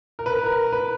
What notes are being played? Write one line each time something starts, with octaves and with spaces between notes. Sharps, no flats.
A#4
B4
A#4
A#4
B4